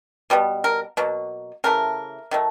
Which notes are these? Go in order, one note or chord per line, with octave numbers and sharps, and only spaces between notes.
B2 G3 B3
A#4
B2 F#3 A#3
C#3 E3 A3 A#4
D#3 F#3 A3